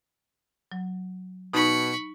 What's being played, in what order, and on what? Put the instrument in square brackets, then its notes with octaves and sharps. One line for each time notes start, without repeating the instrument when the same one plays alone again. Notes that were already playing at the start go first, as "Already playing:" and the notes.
[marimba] F#3
[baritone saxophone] B2 [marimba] D#4 [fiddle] B5 C#6